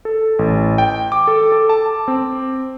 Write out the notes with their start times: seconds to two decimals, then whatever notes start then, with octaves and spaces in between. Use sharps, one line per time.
0.05 A4
0.39 A1
0.78 G5
1.12 D6
1.27 A4
1.52 A4
1.69 A5
2.08 C4